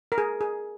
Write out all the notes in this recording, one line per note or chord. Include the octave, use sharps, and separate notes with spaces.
A#4
G#4
G#4